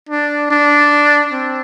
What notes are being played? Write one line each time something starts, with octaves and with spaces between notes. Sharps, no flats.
D4
D4
C4